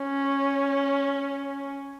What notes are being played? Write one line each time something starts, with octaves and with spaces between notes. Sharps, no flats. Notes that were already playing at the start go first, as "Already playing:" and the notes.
Already playing: C#4